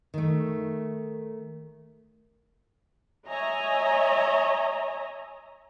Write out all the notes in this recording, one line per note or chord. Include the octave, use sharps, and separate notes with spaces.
D#3 A3
C#5 D#5 E5 G#5 A#5